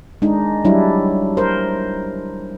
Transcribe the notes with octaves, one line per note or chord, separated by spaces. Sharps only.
G#3 D4 D#4
F#3 G3 D4 E4
A#4 C5